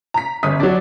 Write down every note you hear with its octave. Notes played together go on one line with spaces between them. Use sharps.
A#5 B6
G1 C#3 D#6 B6
F#3 D4 D5